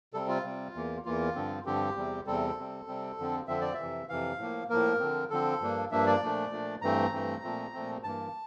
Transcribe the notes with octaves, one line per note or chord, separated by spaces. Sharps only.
C3 G3 C4 A4
F4
C3 G3 C4
E2 E3 A#3
E2 E3 A#3 F4
G2 D3 F3 C4
G2 D3 F3 C4 G4
E2 C3 G3 C4
E2 C3 G3 C4 A4
C3 G3 C4
C3 G3 C4
F2 D3 F3 C4
F2 D3 F3 C4 E5
D5
E5
F2 C3 E3
F2 C3 E3 F5
A2 F3 A#3
A2 F3 A#3 A#4
D3 F3 C4
D3 F3 C4 A4
G2 F3 A#3 D4
G2 F3 A#3 D4 E5
D5
A#2 F3 A3 D4
A#2 F3 A3 D4
G2 E3 A3 C4 A#5
G2 E3 A3 C4
A#2 F3 A3 C4
A#2 F3 A3 C4
G2 E3 A#3 A5